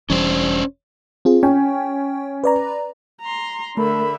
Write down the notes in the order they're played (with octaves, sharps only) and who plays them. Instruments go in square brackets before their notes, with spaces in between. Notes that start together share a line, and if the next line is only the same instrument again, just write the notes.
[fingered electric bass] E1 E3 G3 [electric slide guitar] C#4 D4 C5
[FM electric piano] C4 F4 G#4
[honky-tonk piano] C#4 [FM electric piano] G5
[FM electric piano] B4 D5 A#5
[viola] A#5 C6
[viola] D3 E5 [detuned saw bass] A3 [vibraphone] A#4 [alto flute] B5